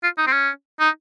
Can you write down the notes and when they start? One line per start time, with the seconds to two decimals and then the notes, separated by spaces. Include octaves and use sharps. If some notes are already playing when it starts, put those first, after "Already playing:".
0.03 F4
0.18 D#4
0.27 C4
0.32 C#4
0.80 D#4